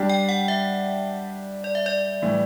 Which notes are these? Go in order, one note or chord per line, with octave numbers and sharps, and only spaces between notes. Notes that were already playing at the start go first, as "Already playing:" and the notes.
Already playing: G3 D4 G4
G5
F#5
E5
D5
E5
D5
A2 E3 G3